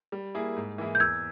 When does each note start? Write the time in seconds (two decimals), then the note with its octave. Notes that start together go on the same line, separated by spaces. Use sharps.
0.12 G3
0.35 A#3 E4 G#4
0.56 G#2
0.78 E3 A#3 E4 G#4
0.95 G6
1.00 E2 E6 G#6